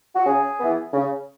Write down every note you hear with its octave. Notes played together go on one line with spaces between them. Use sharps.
F#4
C#3 G#4
E3 B3
C#3